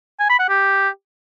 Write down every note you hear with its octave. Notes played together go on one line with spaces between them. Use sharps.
G#5
B5
F#5
G4